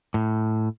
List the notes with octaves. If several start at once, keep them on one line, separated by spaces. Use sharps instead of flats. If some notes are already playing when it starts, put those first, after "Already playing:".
A2